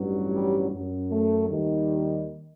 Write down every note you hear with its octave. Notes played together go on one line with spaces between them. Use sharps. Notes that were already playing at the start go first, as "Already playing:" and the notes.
Already playing: A1 G2 F#3
G3
F#2 F#3
A3
D#2 D#3 G3